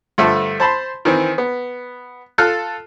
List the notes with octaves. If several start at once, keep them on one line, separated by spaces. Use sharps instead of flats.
G2 D3 F3 A3
C5 A5 B5 C6
D#3 E3 C4
B3
F4 A4 F6 F#6